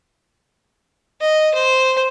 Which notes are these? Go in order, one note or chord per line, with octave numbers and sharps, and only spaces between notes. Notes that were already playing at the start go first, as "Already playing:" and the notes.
D#5
C5